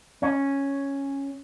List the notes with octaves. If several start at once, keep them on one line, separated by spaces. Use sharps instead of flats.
C#4